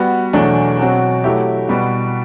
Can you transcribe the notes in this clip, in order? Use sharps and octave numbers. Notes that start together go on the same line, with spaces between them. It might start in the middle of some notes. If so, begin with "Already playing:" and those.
Already playing: G3 B3 F#4
E2 B2 F#3 A3 D4
B2 F#3 C4 F#4
F#3 A3 E4 G4
B2 G3 B3 F#4